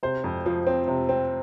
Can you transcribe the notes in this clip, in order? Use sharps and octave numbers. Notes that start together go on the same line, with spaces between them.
C3 C5
F2
F3
C4
C3
C4